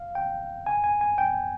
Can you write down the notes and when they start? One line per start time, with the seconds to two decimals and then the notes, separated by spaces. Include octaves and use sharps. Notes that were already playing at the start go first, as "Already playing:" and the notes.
Already playing: F5
0.15 G5
0.66 G#5
0.84 G#5
1.01 G#5
1.18 G5